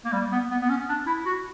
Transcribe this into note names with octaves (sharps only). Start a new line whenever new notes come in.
A#3
G3
B3
B3
B3
C#4
D4
E4
F#4